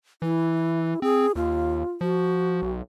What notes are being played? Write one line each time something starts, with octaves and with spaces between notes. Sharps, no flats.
E3 E4
C4 G#4
D#2 F4
F3 F#4
B1